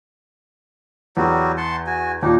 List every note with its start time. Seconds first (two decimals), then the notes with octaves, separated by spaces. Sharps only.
1.17 E2 F#3 G3 F#4
1.58 F#5 A5 C6
1.86 F#4 G#5
2.22 D#2 A#2 D4 D#4